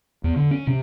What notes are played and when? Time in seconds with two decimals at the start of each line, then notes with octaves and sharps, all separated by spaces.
0.24 E2
0.36 D3
0.51 C#4
0.67 C3